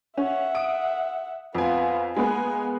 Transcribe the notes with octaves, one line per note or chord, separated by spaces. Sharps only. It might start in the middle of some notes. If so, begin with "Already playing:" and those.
C#4 E5 F#5
D#6 D7
F2 B3 F4 G#5
G#3 A#3 B3 G#5